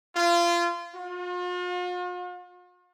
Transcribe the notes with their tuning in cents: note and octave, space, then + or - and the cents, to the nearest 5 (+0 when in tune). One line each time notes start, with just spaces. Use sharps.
F4 -25
F4 +45